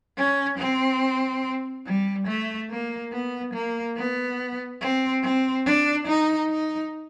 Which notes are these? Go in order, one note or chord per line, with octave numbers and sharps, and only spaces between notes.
C#4
C4
G3
A3
A#3
B3
A#3
B3
C4
C4
D4
D#4
D#4